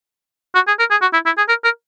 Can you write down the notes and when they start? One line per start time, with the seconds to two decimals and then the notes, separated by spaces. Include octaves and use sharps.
0.55 F#4
0.68 G#4
0.79 A#4
0.91 G#4
1.02 F#4
1.13 E4
1.26 E4
1.37 G#4
1.49 A#4
1.64 A#4